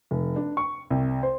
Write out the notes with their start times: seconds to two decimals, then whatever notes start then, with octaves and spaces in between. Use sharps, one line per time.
0.11 F1
0.36 D4
0.57 C#6
0.90 C2
1.23 C5